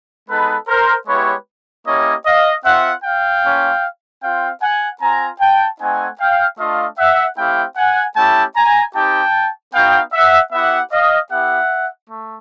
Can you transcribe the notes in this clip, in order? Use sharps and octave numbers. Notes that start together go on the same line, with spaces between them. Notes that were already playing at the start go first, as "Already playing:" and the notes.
G#3 B3 D#4 A4 B4
A#4 C5
G#3 B3 E4 G4 B4 C#5
A#3 C#4 E4 G4 C#5 D#5
D#5 F5
C4 F4 E5 F#5
F5 G5
A#3 C#4 F4
C4 F4 F5 G5
F#5 G#5
C4 F4 G#5 A#5
G5 A5
A3 C4 D#4 F#5 G#5
F5 G5
A3 D4 F4 D#5 F5
E5 F#5
A3 C4 E4 G4 F5 G5
F#5 G#5
A3 C#4 E4 G4 G5 A5
G#5 A#5
C4 D#4 G4 G5 A5
B3 D#4 F#4 F5 G5
E5 F#5
B3 E4 G4 E5 F#5
D#5 F5
B3 E4 G4 E5 F#5
A3